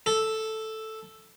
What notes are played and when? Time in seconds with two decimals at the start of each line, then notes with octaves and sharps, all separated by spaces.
0.06 A4